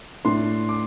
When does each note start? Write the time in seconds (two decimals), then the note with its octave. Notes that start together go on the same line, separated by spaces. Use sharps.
0.25 A2 A3 D4 C6
0.69 D6